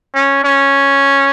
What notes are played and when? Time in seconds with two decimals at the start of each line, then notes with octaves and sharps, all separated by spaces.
0.15 C#4
0.45 C#4